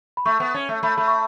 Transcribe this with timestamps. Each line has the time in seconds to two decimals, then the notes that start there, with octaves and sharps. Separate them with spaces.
0.17 B5
0.25 A3 C#6
0.40 B3
0.54 C#4
0.69 A3
0.83 A3 B5
0.98 A3 B5
1.08 C#6